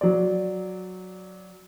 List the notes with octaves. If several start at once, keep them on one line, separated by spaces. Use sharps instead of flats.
F#3 D5